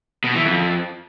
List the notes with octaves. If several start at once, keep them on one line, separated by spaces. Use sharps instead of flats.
B2
E3
F2